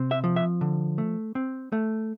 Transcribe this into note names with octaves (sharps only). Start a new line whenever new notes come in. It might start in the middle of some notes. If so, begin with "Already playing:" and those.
Already playing: C3 C4
E5
F3
E5
D3
A3
C4
A3